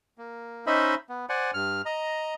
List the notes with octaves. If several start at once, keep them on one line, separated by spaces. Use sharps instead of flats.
A#3
C#4 D#4 C5 D#5 E5 B5
B3
C5 D5 F#5 G#5
G2 F6
D#5 A#5